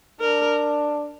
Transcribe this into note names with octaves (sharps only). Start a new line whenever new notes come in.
D4 A#4